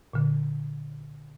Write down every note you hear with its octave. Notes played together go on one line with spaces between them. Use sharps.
A#2 D3